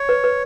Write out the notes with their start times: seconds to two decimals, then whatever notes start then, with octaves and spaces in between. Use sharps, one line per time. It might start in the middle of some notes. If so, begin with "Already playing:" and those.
Already playing: C#5
0.09 B4
0.24 B4